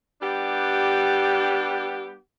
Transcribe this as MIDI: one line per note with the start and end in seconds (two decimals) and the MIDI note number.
0.22 2.18 55
0.22 2.18 59
0.22 2.18 62
0.22 2.18 67